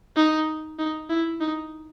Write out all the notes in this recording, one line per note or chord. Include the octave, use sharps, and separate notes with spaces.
D#4
D#4
E4
D#4